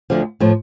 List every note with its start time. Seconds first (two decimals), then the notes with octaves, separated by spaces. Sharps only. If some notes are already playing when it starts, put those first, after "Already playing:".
0.10 D2 D3 F3
0.40 A2 F3